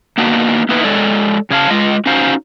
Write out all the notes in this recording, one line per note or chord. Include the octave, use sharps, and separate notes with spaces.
A#3 B3 D4 D#4 F#4
A#3 B3 D#4 E4 B4
G#3 A4 C#5 D5
C#3 C#5 F5 A5
G#3 F4 D#5
C#4 D#4 F#4 C5 F5